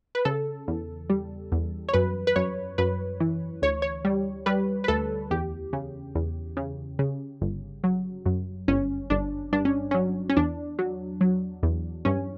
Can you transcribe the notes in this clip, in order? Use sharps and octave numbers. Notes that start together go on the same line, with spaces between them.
B4
C#3 A4
E2
G3
E2
C#5
F#2 B4
B4
F#2 C#5
F#2 B4
E3
D2 C#5
C#5
G3
G3 B4
B4
D2 A4
E2 G4
C#3
E2
C#3
C#3
G1
F#3
F#2
G1 C#4
G1 D4
G2 D4
C#4
F#3 C#4
C#4
E2 D4
F#3
F#3
E2
G2 C#4